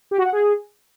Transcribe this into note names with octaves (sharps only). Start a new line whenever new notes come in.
G4
F#4
F#5
G#4